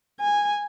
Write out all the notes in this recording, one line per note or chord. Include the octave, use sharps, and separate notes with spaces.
G#5